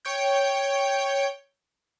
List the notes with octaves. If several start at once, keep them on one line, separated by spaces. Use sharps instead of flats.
C#5 G5 G6